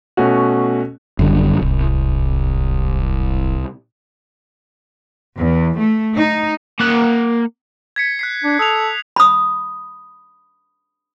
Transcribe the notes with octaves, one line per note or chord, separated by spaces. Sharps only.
B2 A3 C#4 F#4
G#1 F#2 D3 G3
D1 C2
E2
A3
D#4
A#3 F#5
G#6 B6 C#7
F#6 B6 C7
D4
A4 D#6 F7
B5 D#6